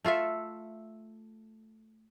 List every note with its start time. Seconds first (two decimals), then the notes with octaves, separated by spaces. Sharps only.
0.04 A3 F4 A4 E5